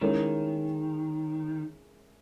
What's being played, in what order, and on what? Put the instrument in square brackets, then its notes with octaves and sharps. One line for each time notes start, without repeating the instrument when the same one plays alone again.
[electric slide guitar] D#3 [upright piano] G#3 C#4 E4 A#4